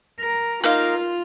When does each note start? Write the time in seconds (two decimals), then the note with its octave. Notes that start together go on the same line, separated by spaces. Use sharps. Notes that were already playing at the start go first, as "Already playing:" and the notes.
0.20 A#4
0.64 A#3 D#4 F4 A#4 F5